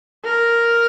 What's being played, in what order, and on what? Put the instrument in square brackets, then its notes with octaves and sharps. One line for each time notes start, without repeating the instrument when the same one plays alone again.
[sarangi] A#4